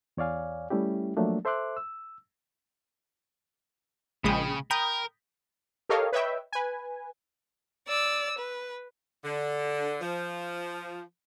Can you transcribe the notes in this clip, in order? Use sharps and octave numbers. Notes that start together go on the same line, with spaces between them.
E2 C#5 D5 F5 G#5
G3 A3 C#4 E4 G4
F3 F#3 A3 A#3 D4
A4 C5 E5 C6 D6 F#6
E6
A#1 C#3 G#3 G5 B5 D#6
A#4 G5 A#5 B5 D#6 G6
G4 A4 A#4 C#5 D#5 F5
B4 C#5 D#5 E5 G5
B4 G#5
D5 E6
B4
D3
F3